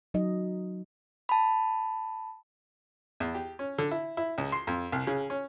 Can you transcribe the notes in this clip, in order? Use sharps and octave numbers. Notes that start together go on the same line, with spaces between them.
F#3 D#4 D#5
A5 B5
E2
G4
C#4
D3
E4
E4
C#2
C6
F2
C2
C#3
C#4